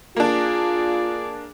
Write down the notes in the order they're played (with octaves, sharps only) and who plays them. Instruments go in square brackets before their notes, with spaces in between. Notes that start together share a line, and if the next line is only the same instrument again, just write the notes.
[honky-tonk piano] A#3 D4 [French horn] F4 [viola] G#4 D5